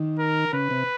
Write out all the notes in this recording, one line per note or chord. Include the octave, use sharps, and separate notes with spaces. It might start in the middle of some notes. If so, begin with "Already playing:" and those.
Already playing: D#3
A#4
C#3 B4
C3